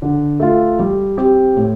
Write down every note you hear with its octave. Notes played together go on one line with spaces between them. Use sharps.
D3
A3 F4
G3
C4 G4
A2